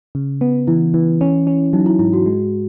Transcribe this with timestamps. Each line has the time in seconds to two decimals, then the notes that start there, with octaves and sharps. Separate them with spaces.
0.15 C#3
0.41 B3
0.67 E3 E4
0.94 E3
1.21 C#4
1.47 C#4
1.73 F#3 D#4
1.86 E4
1.99 G#2 E4
2.13 F#4
2.26 G#3